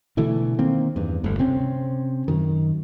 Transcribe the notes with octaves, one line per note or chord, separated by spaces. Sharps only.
B2 D3 E3 A3
D#3 A#3 C4
E2 G2
G1 D2
C3 C4 C#4
F#2 D#3